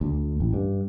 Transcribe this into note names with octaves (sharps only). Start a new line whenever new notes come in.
D2
A1
G2